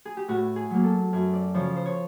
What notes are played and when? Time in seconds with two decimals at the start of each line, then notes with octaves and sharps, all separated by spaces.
0.05 G#4
0.17 G4
0.28 A2 F#4
0.56 G#4
0.70 F#3 A#3
0.84 A4
1.13 F#2
1.33 D5
1.54 C#3 F3 C#5
1.76 C5
1.86 C#5